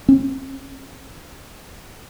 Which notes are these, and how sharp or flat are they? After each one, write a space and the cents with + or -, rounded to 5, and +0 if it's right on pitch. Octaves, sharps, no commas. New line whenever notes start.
C#4 -45